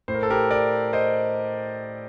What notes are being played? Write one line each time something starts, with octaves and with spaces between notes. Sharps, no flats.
A2 C5
A#4
A4
G4 A#4
A#4 D5
C5 D#5